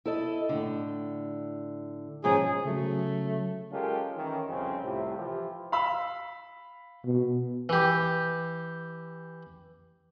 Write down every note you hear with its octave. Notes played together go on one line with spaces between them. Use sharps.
E4 A4 D#5
A2 D3
G#2 F3 C#4 G#4
C#3 F#3 A3
G#3 C#4 F4 G4 A4 A#4
D#3 E3 C#4
C2 F2 C#3 C4 C#4
C2 A2 C3 E4 F4 G4
E3 F3 E4 F4 G4
F5 B5 E6
B2
E3 G4